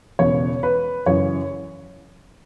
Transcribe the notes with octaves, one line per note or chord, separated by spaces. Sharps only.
E1 E2 C#3 C#5
B4
F#2 C#3 E3 C#5